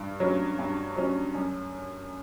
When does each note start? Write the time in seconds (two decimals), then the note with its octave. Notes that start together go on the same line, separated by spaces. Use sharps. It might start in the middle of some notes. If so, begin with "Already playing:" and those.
Already playing: G2
0.20 F#3 C#4
0.59 G2
0.96 F#3 C#4
1.35 F#2